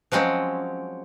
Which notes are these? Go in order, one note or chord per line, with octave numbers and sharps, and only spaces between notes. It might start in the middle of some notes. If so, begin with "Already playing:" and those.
F3 F#3 G#3 C4 C#4